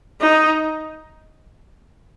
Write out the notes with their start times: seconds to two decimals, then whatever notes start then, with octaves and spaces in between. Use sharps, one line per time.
0.21 D#4